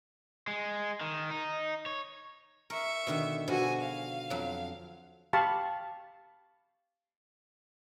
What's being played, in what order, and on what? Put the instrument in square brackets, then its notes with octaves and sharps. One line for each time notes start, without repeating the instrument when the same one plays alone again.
[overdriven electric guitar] G#3
D#3
D#4
C#5
[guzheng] A#4 [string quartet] E5 C#6
[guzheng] B2 D3 D#3
[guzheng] B2 D3 F3 [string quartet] F#4 G#4 G#5
[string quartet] F5
[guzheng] F2 F#3
[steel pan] G4 F5 A5 B5 C#6